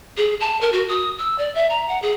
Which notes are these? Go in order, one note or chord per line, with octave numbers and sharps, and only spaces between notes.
G#4
A5
A#4
F#4
D#6
E6
D5
E5
A#5
F#5
G#4